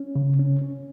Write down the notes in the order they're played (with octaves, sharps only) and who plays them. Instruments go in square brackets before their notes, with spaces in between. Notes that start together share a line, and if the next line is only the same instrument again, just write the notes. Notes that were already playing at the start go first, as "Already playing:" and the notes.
Already playing: [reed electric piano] C#4
C#3
C#4
C#4